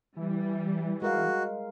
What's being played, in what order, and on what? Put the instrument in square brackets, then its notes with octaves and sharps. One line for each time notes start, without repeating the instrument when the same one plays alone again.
[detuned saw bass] E3 [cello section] G3
[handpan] G#3 A#4 F5 [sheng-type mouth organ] F#4